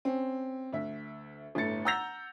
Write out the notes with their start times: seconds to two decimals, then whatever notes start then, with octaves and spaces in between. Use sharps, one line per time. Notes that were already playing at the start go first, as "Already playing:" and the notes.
0.05 C4 C#4
0.73 D2 E5
1.55 G1 A2 A3 A4 A6 C#7
1.85 F#5 A#5 E6 G6 A#6 F7